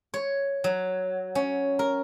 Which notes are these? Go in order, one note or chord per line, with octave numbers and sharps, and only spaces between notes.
C#5
F#3
C#4
A#4